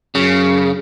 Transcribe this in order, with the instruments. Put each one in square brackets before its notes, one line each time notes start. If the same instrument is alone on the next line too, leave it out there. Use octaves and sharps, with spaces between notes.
[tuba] F#2 [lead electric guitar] C#3